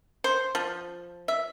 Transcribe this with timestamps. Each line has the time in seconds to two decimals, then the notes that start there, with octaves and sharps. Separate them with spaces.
0.24 C5
0.55 F3
1.28 E5